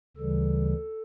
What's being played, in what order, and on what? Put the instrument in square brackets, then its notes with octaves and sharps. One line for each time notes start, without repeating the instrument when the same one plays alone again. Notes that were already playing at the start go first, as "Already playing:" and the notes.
[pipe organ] D2 C#3 E3 G3 A4